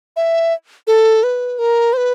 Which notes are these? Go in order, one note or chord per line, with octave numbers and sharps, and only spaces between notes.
E5
A4
B4
A#4
C5
B4